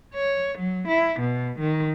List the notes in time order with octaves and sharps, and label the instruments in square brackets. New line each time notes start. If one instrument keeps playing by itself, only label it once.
[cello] C#5
F#3
E4
B2
D#3